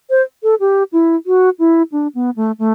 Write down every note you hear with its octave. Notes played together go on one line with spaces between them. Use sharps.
C5
A4
G4
E4
F#4
E4
D4
B3
A3
A3